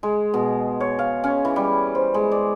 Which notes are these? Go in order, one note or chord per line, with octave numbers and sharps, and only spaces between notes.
G#3
B2
C#5
F5
C#4
E3
G3
C5
G#3
D5